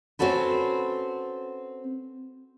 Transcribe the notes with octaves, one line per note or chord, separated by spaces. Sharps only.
C4 C#4 F#4 A4 B4